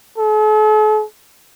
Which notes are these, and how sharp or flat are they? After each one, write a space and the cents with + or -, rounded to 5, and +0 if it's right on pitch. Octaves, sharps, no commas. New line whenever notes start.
A4 -45